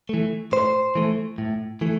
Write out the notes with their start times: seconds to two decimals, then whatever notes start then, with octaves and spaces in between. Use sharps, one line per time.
0.09 E3 A3
0.52 A2 C5
0.95 E3 A3
1.38 A2
1.81 E3 A3